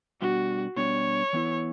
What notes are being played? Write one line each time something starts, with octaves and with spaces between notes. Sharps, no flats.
B2 G3 B3 D4 F#4
B2 G3 B3 D4 C#5
E3 B3 E4